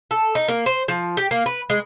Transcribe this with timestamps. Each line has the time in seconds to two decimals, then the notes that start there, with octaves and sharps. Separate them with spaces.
0.11 A4
0.35 D#4
0.48 A#3
0.66 C5
0.88 F3
1.17 G4
1.31 A#3
1.46 B4
1.70 G#3